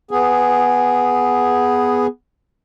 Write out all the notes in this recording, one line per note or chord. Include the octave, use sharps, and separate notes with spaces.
B3 G#4